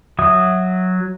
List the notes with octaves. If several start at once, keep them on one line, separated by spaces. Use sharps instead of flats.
F#3 E5 D#6